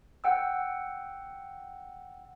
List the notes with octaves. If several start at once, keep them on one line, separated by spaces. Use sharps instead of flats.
F#5 G5 E6